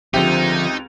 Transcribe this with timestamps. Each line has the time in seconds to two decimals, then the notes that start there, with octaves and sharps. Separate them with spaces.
0.14 C#2 D3 F3 C4 D#4 G4 E5